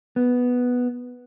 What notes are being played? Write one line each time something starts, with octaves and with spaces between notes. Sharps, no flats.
B3